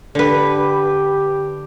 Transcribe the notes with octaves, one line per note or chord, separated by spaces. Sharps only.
D3 G4 B4